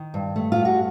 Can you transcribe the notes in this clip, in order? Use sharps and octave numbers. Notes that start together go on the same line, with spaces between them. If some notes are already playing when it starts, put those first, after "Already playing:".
Already playing: D#3
G2
A3
G2 F4
F#4